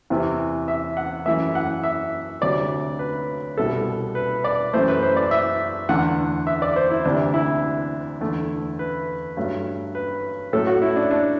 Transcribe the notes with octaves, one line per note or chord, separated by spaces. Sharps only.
E2 C3 E3
E5
F#5
F#2 E3 A3 E5
F#5
E5
D2 C3 F#3 A3 D5
B4
C2 B2 G3 A4
B4
D5
F#2 E3 A3 C5
B4
C5
D5
E5
E2 D3 A3 F#5
E5
D5
C5
E4
D2 C3 E3 D4
E4
E2 D3 A3
B4
G2 F#3 A3
B4
A2 F#3 A3 A4
F#4
E4
D4
D4